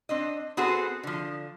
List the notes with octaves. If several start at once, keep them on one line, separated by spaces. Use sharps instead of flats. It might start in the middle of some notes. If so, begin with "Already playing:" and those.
C4 D4 D#5
B3 C4 F#4 G#4 A4 C5
D3 F3